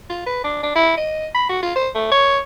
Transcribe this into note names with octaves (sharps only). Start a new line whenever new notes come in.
F4
B4
D4
D4
E4
D#5
B5
F#4
F4
C5
A3
C#5